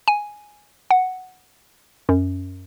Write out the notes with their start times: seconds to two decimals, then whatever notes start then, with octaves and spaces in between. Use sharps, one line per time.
0.08 G#5
0.91 F#5
2.09 F#2